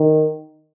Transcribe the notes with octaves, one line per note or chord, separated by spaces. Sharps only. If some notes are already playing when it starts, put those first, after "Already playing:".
Already playing: D#3